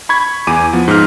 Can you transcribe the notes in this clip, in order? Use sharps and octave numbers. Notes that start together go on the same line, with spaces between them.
B5 C#6 G#6
E2 G#5 D6 D#7
F3 B3
G#2 F6